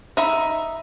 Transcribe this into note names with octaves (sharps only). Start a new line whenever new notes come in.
D#4 E5 B5